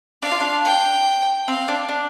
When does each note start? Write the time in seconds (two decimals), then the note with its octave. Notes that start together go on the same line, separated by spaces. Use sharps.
0.22 D4 F5
0.32 F4
0.40 D4
0.65 G5
1.47 C4 F5
1.68 D4
1.89 D4